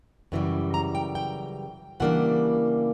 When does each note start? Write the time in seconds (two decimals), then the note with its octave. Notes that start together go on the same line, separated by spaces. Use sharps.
0.32 F#2 C#3 E3 G3
0.74 A#5
0.95 G5
1.15 G5
2.00 C#3 E3 G3 A#3 D4 F#5